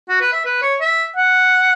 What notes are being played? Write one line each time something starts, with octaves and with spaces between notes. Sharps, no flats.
F#4
B4
E5
B4
C#5
E5
F#5